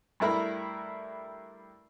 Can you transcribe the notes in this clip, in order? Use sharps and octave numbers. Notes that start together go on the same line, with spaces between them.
G2 A3 E4 A#4 B5